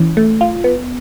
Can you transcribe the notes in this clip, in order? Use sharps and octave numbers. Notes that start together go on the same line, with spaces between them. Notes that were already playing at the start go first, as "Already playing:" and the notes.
Already playing: E3 C#4
A3
F4
B3